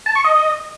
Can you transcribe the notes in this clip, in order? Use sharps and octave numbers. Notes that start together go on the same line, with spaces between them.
A5
C#6
D#5